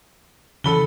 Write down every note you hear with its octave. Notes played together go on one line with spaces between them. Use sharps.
C#3 E3 A4 B5 G7